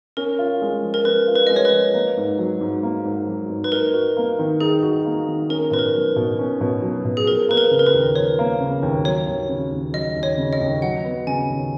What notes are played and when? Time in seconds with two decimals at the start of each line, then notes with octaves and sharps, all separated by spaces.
0.17 C#4 A#4
0.39 F4
0.62 G#3
0.83 F3
0.94 A#4
1.05 C#4 B4
1.27 F4
1.35 B4
1.47 G#3 D#5
1.56 C#5
1.65 B4
1.72 F3
1.94 A#3
2.17 G#2
2.39 F#3
2.61 G#2
2.83 A#3
3.05 G#2
3.27 F#3
3.50 G#2
3.64 B4
3.72 D#4 A#4
3.94 F#4
4.17 A#3
4.39 D#3
4.61 D#4 G#4
4.83 F#4
5.05 A#3
5.27 D#3
5.49 C#4 A#4
5.71 B2 B4
5.79 A#4
5.94 F#3
6.16 B2
6.39 C#4
6.61 B2
6.82 F#3
7.05 B2
7.17 G#4
7.27 F3 A#4
7.49 A#3 B4
7.57 A#4
7.71 C#3
7.79 A#4
7.87 B4
7.94 D#2
8.16 F3 C#5
8.39 A#3
8.60 C#3
8.83 D#2
9.05 F#3 C#5
9.27 D#2
9.49 C#3
9.72 D#2
9.93 F#3 D#5
10.16 D#2
10.23 C#5
10.38 C#3
10.53 D#5
10.60 D#2
10.82 F#3 F#5
11.04 B3
11.27 C#3 G#5
11.49 D#2